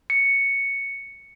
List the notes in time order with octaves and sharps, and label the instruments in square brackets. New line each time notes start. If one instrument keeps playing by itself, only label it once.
[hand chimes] C#7